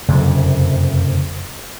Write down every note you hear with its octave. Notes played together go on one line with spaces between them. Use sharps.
F#1 F2 C3